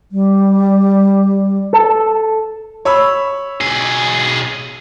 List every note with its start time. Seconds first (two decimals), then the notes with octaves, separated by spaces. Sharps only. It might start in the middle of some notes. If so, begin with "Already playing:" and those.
0.12 G3
1.73 A4
2.85 C#5 B5 E6
3.61 B1 G#4